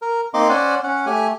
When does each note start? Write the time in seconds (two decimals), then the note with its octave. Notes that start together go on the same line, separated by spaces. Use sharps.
0.02 A#4
0.34 A#3 C4 D#4 D#5 C6 D6
0.49 C#4 C5 D5 F#5 G#5
0.83 C#4 F#5
1.06 A3 G4 G#5